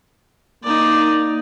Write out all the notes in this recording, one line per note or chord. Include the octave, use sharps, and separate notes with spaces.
A#3 D#4 D5